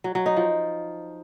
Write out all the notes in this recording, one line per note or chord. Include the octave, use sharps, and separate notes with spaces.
F#3
F#3
D#4
F3